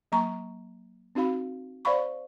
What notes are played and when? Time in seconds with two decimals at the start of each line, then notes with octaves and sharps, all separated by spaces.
0.12 F#3 A#3 A#5 C#6
1.15 C4 D#4 F#4 F5 B5
1.85 C5 D5 F5 F#5 B5 C#6